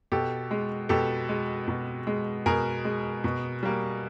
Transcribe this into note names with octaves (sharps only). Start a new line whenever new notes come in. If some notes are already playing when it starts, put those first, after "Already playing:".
B2 G4 A4
G#3
B2 G4 A4
G#3
B2
G#3
B2 G#4 A#4
G#3
B2
G3 A#3